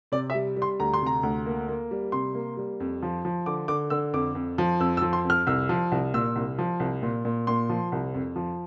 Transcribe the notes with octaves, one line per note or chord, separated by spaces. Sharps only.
C3 D5
E5
G3
G3
C6
D2 A#5
C6
C3 A#5
D2
A#3
A#3
G3
C3 C6
A#3
G3
F2
F3
F3
D3 D6
D3 D6
D3 E6
F2 D6
F2
F3
F2 E6
E6
F3
C6
F2
F6
C2 E6
F3
C2
A#2 E6
C2
F3
C2
A#2
A#2
A#2 C6
F3
C2
F2
F3